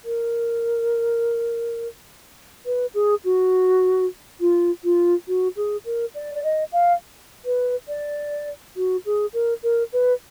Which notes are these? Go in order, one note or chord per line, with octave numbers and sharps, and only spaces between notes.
A#4
B4
G#4
F#4
F4
F4
F#4
G#4
A#4
D5
D5
D#5
F5
B4
D5
F#4
G#4
A#4
A#4
B4